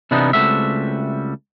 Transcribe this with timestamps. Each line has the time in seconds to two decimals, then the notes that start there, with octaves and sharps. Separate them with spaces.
0.11 C3 E3 B3 D4 D#4
0.33 C#2 G3 A3 C4 F#4 E5